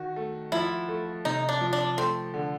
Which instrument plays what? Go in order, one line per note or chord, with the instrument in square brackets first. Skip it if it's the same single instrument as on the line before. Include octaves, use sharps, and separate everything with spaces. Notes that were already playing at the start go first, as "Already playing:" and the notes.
Already playing: [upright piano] D#3 F#4
A3
[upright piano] F3 [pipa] E4
[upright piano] A3
[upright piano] C3 [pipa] D#4
[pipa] D4
[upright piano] F3
[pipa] D4
[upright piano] A3 [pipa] C4
[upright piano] D3